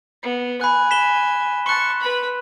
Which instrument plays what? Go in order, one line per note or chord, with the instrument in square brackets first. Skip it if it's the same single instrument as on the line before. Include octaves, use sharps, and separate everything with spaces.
[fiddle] B3
[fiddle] G#5 [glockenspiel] B5 F#6
[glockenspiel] B6 E7 G7
[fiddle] A5 C#6 [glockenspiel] C6 F#6
[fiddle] B4 B5